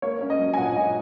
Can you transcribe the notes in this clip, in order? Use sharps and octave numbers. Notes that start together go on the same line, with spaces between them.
A#3 C#5
C#4
D#5
F#3
G#5
A#2 F#5
A#2 D#5